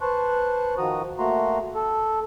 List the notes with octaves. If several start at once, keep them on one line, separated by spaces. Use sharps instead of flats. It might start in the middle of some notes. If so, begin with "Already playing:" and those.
B4 C5 A5 C6 C#6 F#6
D#3 F3 F#4 A#5 D#6
A3 A#3 F#4 A#5 C6
A4